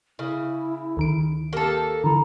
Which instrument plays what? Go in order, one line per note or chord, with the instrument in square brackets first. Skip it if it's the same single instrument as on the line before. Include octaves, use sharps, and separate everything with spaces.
[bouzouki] C#3 [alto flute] E4
[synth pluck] D2 D#3 D7
[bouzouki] A#3 A4 [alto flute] G4
[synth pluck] D3 E3 [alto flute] A#5